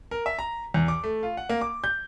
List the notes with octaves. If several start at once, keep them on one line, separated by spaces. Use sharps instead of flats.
A#4
E5
A#5
E2
D6
A3
F4
F#5
A#3
D6
G6